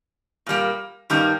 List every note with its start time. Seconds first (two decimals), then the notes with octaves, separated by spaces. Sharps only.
0.46 A#2 G3 A#3
1.10 G2 D#3 G3 A#3 D#4